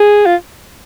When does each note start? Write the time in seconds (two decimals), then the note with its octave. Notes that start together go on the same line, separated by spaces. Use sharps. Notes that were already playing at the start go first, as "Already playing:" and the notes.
Already playing: G#4
0.26 F4